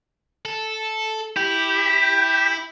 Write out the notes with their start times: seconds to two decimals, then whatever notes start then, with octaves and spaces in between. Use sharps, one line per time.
0.45 A4
1.36 E4 G4